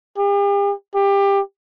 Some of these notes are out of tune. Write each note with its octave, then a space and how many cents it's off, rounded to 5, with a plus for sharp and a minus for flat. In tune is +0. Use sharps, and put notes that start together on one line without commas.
G4 +45
G4 +20